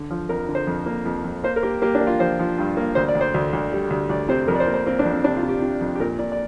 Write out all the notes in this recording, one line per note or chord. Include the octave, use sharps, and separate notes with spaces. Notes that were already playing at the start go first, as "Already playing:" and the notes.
Already playing: D3
F3
F2 A#4
D3
C5
F2
A#3
F2
F2
A#3 C5
A#4
A#3 G4
A#3 G4
D4
A#3
F4
F3 C5
F3
G2
A#3
D2 C5
D5
D2
C5
D2
D2
G3
D2
D2 D5
C3 C5
F2 A#4
D5
C5
A#3
C5
A#3 C4
D4
F2
C4
C3 D4
F4
C3
G4
C3
F2
G4
A#2 A#4
A#2 D5
D5